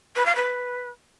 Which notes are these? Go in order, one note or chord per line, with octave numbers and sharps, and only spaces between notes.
B4
F5
B4